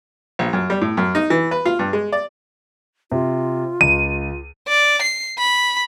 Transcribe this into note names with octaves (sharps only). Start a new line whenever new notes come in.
A#1
F#2
G3
A2
F#2
D#4
E3
B4
F4
G2
G#3
D5
C3 F4
C#2 D#7
D5
C7
B5